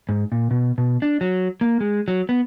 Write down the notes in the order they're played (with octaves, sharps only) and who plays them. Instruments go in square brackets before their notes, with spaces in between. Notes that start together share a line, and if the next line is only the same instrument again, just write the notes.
[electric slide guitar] G#2
A#2
B2
B2
D4
F#3
A#3
G#3
F#3
B3